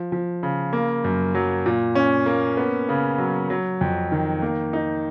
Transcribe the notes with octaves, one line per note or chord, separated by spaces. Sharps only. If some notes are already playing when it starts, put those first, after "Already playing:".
Already playing: F3
F3
C#3
A#3
F#2
F#3
A#2
C#4
A#3
B3
C#3
F#3
F#3
F2
D#3
A#3
D#4